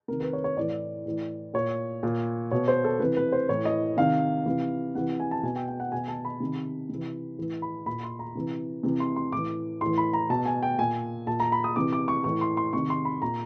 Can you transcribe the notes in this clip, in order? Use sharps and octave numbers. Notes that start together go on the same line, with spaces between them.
C3 D#3 A#4
B4
C#5
C#5
A2 E3 D5
A2 E3
A#2 C#5
A#2
B2 C#5
C5
A4
C3 E3 B4
B4
C5
A2 E3 C#5
D#5
C3 D#3 F5
C3 E3
C3 E3 F#5
G#5
A5
B2 G#5
G5
G5
F#5
B2 G#5
A5
B5
C3 D#3
C3
E3
A2 E3
B5
A#2 B5
C6
A#5
C3 E3
C3 E3
C6
C6
A2 E3 D6
A2 E3 C6
B5
A#5
B2 A5
G#5
G5
A#2 G#5
A#2 A5
A#5
B5
D#6
C3 E3 D6
D6
C#6
A2 E3 C#6
C6
C6
C3 D#3 C#6
C6
B5
A#2 A#5